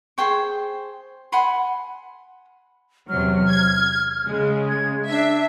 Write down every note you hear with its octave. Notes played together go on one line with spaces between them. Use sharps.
G#4 C5 G5 C#6
F#5 G#5 B5 C6
E2 C3 F#3 F6
G#6
C#3 G#3
G#6
D4 E5